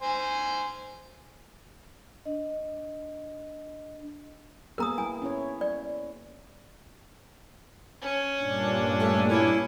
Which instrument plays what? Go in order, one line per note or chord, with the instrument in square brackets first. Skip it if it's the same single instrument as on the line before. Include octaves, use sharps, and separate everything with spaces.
[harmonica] C5 G#5
[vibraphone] D4 D#5
[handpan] A#3 B3 G#4 [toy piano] A#4 A#5 D#6
[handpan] E4 [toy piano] G#5
[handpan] C#4 E4 C#5
[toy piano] D5
[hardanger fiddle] C#4
[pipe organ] G2 A#2 D4
[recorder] A3
[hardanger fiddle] C#4 [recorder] E4